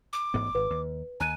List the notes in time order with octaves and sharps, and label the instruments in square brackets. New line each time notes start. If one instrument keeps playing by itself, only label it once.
[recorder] D6
[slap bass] A1 G#2 B3
[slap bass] G#1 [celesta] B4
[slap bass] D#2
[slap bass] D#2 [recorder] G#5 [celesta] A#5 F#6 D#7